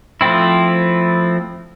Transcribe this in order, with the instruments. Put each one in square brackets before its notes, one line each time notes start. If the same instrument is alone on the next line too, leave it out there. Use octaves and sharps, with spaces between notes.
[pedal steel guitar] F3 A3 C4 E4